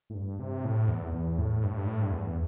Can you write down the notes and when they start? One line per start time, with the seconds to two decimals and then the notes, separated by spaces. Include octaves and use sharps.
0.10 A2
0.14 G2
0.39 C3
0.65 A2
0.88 E2
1.13 E2
1.38 A2
1.63 G2
1.71 A2
1.77 G2
1.87 A2
2.02 G2
2.12 E2